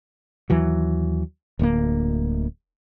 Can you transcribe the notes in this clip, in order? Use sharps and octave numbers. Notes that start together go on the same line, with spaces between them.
D#2 E3 F#3
D1 D2 G#3 A#3